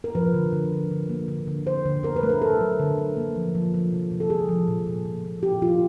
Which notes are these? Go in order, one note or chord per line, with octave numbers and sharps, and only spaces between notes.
A#4
F3 B4
D3
D3
D3
D3
A#3
D3
D3
D3 C5
D3
D3 A#4
B4
A3
A#4
D3 A4
F#3
D3
D3
A#3
F3
F3
F3
C3
C3
A4
F3 G#4
F3
A#2
A#2
A#2
A#2
A#2 G4
F3 F4